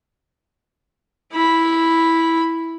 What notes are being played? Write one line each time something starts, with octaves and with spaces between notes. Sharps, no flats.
E4 B5